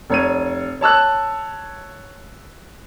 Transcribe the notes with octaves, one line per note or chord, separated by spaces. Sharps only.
F1 C#5 D#7
C#5 A5 E6 F#6